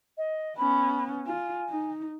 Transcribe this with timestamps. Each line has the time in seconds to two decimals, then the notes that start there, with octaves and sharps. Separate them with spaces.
0.17 D#5
0.57 B3 C#4 B5
1.26 F4 G#5
1.70 D#4